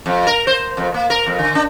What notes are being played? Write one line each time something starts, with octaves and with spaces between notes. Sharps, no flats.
F2
A#4
C5
F2
A#3
A#4
F2
D3
D4